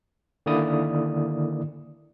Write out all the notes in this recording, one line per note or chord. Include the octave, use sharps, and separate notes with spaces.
D3 D#3 A#3 E4 D5 D#6